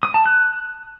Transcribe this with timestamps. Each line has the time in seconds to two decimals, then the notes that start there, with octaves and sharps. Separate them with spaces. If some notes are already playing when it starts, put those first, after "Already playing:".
0.03 D#6
0.14 A5
0.26 F#6